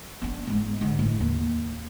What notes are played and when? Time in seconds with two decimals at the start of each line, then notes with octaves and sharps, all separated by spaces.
0.22 B3 D4
0.47 G#2 G#3
0.81 G#2 D3
0.99 A2
1.20 D#2